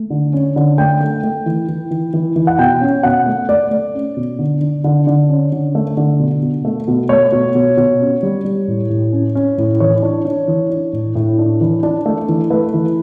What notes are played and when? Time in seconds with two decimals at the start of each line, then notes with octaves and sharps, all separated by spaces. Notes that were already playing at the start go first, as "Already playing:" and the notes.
Already playing: A3
0.10 D3
0.33 C#4
0.56 D3
0.78 A3 G5
1.01 A3
1.23 A3
1.46 E3
1.68 E3
1.91 E3
2.14 E3
2.36 E3
2.47 F#5
2.58 B2 G5
2.81 C#4
3.03 B2 F#5
3.26 A3
3.49 A3 D5
3.71 A3
3.94 C#4
4.16 B2
4.39 D3
4.61 D3
4.84 D3
5.07 D3
5.29 C#4
5.52 D3
5.75 A3
5.97 D3
6.19 B2
6.42 B2
6.65 A3
6.88 B2
7.09 A3 C#5
7.32 B2
7.55 B2
7.77 B2
8.00 C#4
8.23 G3
8.45 G3
8.68 A2
8.90 A2
9.12 C#4
9.35 C#4
9.58 A2
9.80 E3 C#5
10.02 D4
10.25 D4
10.48 E3
10.70 D4
10.93 A2
11.15 A2
11.38 D4
11.61 E3
11.83 D4
12.06 A3
12.29 E3
12.50 A3 B4
12.74 E3